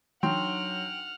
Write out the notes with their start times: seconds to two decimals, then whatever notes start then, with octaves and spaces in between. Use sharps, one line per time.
0.23 F#3 D4 D#4 F#4 F#5 G5 C6 F6